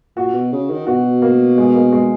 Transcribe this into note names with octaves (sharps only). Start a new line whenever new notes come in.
A#2 F#4
B2
C#3
D#3
B2 F#4
A#3
G#3
A#3
G#3